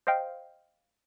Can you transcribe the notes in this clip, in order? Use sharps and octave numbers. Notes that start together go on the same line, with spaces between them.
C5 D#5 F5 G5